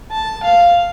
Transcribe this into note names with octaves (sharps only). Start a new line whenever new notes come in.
A5
F5